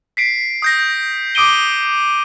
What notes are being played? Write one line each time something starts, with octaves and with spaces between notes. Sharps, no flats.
B6 C7 D7
D#6 G6 A#6
D6 D#6 D7 D#7 G7